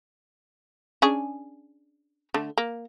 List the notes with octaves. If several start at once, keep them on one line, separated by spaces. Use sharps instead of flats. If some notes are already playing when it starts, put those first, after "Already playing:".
C#4 D4 G#4
D3 A3
A#3